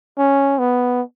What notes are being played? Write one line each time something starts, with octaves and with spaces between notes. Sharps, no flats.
C#4
B3